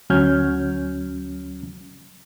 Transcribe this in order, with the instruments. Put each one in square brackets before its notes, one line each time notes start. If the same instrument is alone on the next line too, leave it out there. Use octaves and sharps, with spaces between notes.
[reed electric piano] D2 F#3 C#4 F6 G6 G#6